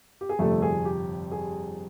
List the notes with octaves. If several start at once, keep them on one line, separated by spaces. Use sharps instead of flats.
G4
G#4
G1 F2 C3 A3 A4
G#4
G4
G#4